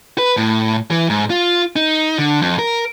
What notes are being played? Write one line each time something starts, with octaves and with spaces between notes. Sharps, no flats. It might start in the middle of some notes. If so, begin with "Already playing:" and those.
B4
A2
E3
G#2
F4
D#4
D3
F2
A#4